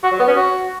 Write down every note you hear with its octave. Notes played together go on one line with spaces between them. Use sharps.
F#4
F#3
B3
C#4
F#4